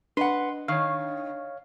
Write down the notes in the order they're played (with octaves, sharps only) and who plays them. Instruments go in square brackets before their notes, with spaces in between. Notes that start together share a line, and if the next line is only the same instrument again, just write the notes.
[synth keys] D4 D#5 [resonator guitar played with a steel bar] B4 F#5 [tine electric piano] C6
[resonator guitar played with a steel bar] D#3 [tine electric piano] C#5 F5